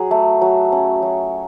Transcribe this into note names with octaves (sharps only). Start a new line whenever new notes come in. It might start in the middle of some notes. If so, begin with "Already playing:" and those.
Already playing: F#3 G#4
A3
F#3
C#4
F#3